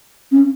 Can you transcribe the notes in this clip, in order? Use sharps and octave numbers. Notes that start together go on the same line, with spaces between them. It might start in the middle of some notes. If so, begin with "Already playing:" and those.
C#4